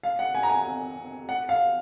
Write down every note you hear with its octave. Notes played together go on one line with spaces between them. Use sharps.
F5
F#5
G#5
A#5
G#5
F#5
F5